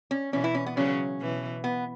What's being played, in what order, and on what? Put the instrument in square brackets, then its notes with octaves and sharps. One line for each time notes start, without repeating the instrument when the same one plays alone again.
[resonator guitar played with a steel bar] C#4
[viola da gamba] B2 E3 [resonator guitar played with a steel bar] C#4
[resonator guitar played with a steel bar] E4
C#4
B3
[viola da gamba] C#3 F#3 [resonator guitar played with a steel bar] C#4
[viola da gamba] B2 E3
[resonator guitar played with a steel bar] B3